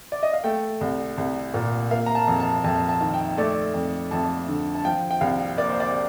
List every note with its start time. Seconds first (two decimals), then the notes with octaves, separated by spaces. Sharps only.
0.12 D5
0.23 D#5
0.33 F5
0.44 A3 G5
0.81 C2
1.18 C2
1.54 A#2
1.91 A#3 F5
2.06 A#5
2.15 A5
2.28 F2
2.40 A5
2.64 F2 A5
2.89 A5
3.01 D#3
3.14 G5
3.38 A3 D5
3.74 F2
4.11 F2 A5
4.48 D3
4.75 A5
4.85 F3 G5
5.11 G5
5.21 C2 F5
5.57 A#3 D5
5.69 C5
5.80 D5